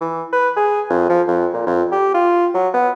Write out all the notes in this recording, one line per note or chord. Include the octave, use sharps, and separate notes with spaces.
E3
B4
G#4
F2
F3
F2
A#2
F2
G4
F4
F#3
B3